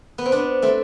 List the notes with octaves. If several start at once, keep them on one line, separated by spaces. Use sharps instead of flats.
B3
C4
B3 D4
A3 C4